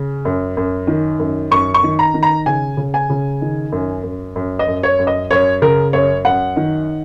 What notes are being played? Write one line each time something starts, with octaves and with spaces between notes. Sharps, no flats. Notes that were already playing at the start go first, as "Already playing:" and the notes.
Already playing: C#3
F#2
F#2
D#3
F#2
F#2 C#6
C#6
D#3
A#5
D#3
A#5
C#3 G#5
C#3
G#5
C#3
D#3
F#2
F#2
F#2
D#5
F#2
C#5
F#2
D#5
F#2 C#5
C#3 A#4
F#2 C#5
F#2 F#5
D#3